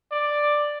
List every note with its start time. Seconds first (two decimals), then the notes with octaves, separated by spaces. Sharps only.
0.12 D5